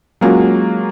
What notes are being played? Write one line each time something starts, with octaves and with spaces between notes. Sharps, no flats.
F#3 G#3 A#3 C#4 F4 F#4